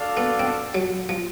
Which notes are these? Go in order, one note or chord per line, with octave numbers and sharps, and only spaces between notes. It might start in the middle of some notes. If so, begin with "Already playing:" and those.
Already playing: D4 F#4 A4 D5 F5
B3
C4
F#3
F3